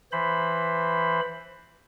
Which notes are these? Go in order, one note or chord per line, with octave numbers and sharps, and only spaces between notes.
E3 C5 B5